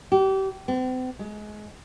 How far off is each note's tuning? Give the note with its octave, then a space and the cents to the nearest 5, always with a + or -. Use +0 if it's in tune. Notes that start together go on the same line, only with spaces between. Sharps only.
G4 -30
C4 -40
G#3 +25